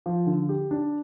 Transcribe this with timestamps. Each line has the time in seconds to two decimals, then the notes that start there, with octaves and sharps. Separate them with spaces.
0.06 F3
0.26 D3
0.49 G4
0.71 D4